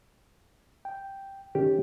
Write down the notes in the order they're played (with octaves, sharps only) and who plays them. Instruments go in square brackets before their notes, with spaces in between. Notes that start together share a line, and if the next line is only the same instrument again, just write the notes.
[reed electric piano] G5
[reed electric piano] D#3 C#4 [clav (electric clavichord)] G4